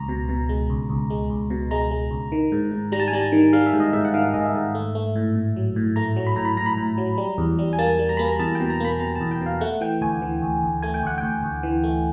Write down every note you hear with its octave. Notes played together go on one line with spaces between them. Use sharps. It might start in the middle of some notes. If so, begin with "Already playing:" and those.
Already playing: C#2 A#5
B2
B2
G#3
C#2
C#2
G#3
C#2
B2
G#3 A#5
G#3
C#2
D#3
G#2
G#2
G3 A#5
A5
G#5
G3 A5
D#3
G3 F5
E5
G#2
D#5
G#2 E5
F#5
D#3 F5
G#2 D#5
E5
G#2
A3
A3
A2
A2
F#3
A2
A3 A#5
F#3
B5
A2 A#5
B5
A2 A#5
B5
A2 A#5
F#3
G3
E2
G3
G#5
A#3 A5
G3
A#5
A#3 B5
A#5
E2 A5
B2 G5
A#5
A#3 B5
B2 A#5
A5
E2
G5
B2
F5
A3 F#5
E3 G5
D2 G#5
E3
D2
D2
A3 G#5
G5
D2 F#5
D2 G5
D2
E3
A3